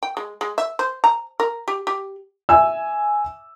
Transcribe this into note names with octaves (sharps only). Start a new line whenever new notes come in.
G5
G#3
G#3
E5
C5
A#5
A#4
G4
G4
E5 G#5 E6